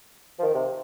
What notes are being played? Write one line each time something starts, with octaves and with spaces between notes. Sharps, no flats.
F3
D#3
C3